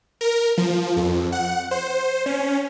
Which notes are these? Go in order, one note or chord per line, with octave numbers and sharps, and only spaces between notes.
A#4
F3
F2
F#5
C5
C#4